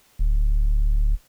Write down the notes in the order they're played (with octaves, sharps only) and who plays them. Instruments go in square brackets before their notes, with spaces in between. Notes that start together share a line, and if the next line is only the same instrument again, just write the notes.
[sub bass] D1